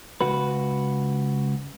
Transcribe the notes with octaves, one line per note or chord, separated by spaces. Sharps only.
C#2 F#4 B4